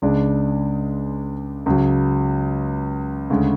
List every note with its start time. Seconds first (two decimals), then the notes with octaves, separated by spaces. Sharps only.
0.02 C#2 C#3 G#3 D4
1.66 C#2 C#3 F#3
3.30 D2 C#3 G#3